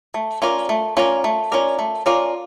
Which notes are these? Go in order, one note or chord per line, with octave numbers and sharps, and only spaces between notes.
A3
C#4 F4 A#4 D5
A3
C#4 F4 A#4 D5
A3
C#4 F4 A#4 D5
A3
C#4 F4 A#4 D5